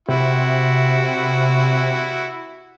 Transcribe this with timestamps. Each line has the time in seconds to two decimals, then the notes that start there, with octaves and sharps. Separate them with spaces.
0.09 C3 E4 F#4